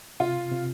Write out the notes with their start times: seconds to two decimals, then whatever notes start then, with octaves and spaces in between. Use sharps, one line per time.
0.20 C3 F4
0.51 C3